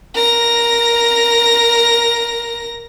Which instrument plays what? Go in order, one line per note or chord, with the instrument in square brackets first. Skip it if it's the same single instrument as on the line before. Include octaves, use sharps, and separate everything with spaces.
[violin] A#4 A#6